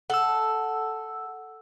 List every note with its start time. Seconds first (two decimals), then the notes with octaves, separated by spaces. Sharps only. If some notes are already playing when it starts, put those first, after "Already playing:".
0.10 A4 F#5 E6